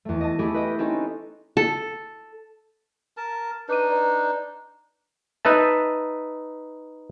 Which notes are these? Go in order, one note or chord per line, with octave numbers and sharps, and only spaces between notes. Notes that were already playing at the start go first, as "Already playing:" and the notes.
E2 A3
D#5 A5
A3 E4 G4 G#4
B4 D#5 G5
C4 C#4 D#4 G#4 A4 B4
A4
A#4 A5
D4 D#4 B4 D6 D#7
B4 D5 A#5
D#4 B4 E5 A5